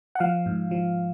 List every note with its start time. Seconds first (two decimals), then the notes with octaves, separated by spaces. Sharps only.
0.15 F#5
0.20 F3 F5
0.46 G#2
0.71 F3